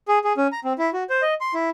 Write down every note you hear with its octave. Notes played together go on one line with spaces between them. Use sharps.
G#4
G#4
C#4
A#5
C4
E4
F#4
C5
D#5
C6
E4